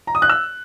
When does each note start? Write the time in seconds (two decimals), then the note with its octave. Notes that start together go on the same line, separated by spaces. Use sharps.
0.07 A#5
0.15 D#6
0.22 F#6
0.30 E6